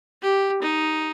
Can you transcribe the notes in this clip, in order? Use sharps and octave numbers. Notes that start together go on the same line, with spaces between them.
G4
D#4